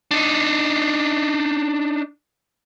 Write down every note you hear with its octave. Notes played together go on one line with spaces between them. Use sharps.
D4 D#4